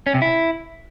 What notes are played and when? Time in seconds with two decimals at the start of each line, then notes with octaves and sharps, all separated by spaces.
0.07 C#4
0.14 C3
0.22 E4